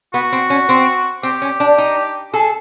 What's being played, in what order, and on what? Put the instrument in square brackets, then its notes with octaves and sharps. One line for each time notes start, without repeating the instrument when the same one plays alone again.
[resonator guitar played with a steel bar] B3 [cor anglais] F#4
[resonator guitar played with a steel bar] C4
C#4
C4
[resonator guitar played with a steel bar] C4 [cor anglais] G4
[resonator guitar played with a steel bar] C#4
D4
D#4
[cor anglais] G#4 [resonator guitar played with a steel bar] A4